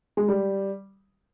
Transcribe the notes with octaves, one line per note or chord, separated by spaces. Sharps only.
G#3
G3